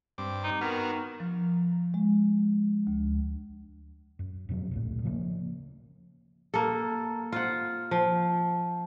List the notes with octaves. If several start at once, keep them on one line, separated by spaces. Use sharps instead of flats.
G2 C4 D6
D#4
D#3 B3 F#4 A#4
F3
G#3
D2
F#2
F2 B2 F3 F#3
D1 A#1 A2
C#3 F3 G#3 A#3
A#3 A4
F4 C5 F#5
F3